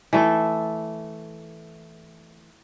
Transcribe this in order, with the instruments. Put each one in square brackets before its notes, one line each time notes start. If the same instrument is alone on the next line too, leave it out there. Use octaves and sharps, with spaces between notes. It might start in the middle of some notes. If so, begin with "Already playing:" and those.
[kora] E3 A3 A4